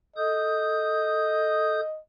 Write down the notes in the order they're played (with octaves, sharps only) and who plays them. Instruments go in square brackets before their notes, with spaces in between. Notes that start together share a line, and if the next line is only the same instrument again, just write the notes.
[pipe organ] A4 D#6 G6 [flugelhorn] D#5